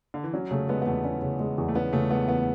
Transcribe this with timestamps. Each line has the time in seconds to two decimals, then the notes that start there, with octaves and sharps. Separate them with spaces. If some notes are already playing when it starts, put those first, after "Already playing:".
0.14 D3
0.24 E3
0.34 F#3 C#4
0.51 C#3 A3
0.69 G#3 B3
0.82 B3
0.86 E2 A3
1.05 C#4
1.22 C#3
1.40 G#3
1.58 E2
1.68 A3
1.75 B3 C#4
1.93 C#3 A3
2.11 G#3 B3
2.28 E2 B3